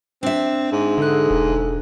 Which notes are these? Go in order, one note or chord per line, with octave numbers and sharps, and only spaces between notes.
C4 D4 E5
G#2
D3 G#4 A4 F#6
E1